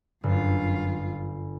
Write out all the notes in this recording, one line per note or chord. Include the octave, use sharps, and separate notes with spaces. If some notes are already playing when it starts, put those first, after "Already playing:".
G1 F#2 F4